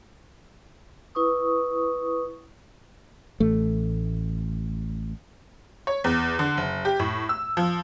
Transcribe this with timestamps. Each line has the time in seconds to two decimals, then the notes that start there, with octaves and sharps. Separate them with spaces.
1.15 E4 B4 C#6 D#6
3.40 A1 A3
5.87 C#5
6.04 E2
6.39 D3
6.57 F#1
6.85 G4
7.00 A2
7.29 E6
7.57 F3